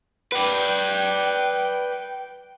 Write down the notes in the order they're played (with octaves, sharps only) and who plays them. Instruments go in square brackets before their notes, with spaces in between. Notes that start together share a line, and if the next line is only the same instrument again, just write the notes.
[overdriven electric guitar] B4 D5 [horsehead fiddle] G5